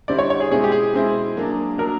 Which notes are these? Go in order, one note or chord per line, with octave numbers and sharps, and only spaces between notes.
D3 G3 C4 E4 D5
C#5
C#5
G#4
B2 G#3 C4 E4 G#4
G4
G#4
B2 G#3 C4 E4
F#3 A#3 D4
F#3 A#3 D4 A#4